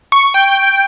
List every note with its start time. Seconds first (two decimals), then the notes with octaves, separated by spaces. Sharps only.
0.12 C#6
0.34 G5